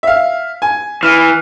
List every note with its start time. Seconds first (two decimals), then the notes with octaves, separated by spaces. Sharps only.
0.03 E5 F5
0.62 G#5
1.03 E3 F6